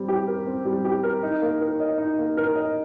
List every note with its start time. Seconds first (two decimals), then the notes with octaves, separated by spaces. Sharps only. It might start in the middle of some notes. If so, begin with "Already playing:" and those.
Already playing: G3 C4
0.08 G4
0.28 A#4
0.46 C4
0.66 G3
0.85 G4
1.03 A#4
1.23 D#4
1.42 A#3
1.61 A#4
1.80 D#5
1.98 D#4
2.18 A#3
2.37 A#4
2.55 D#5